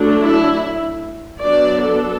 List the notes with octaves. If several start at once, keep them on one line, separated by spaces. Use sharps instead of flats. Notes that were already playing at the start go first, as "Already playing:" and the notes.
Already playing: F#3 A3 D4
E4
F#3 B3 D4 D5
A4